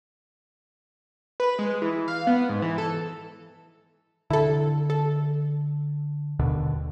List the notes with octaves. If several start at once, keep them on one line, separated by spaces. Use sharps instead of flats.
B4
G#3
E3
F5
B3
G#2
E3
A4
D3 E4 A4
A4
D#2 B2 D3